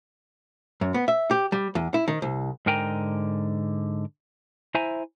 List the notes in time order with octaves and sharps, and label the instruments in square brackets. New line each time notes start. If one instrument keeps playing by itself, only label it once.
[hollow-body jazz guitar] F#2
B3
E5
G4
G3
E2
E4
D#3
C2
[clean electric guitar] G#2 D3 A#4 G5 G#5 A#5
E4 C5 E5 G#5 A#5